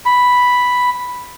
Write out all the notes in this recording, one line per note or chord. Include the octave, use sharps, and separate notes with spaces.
B5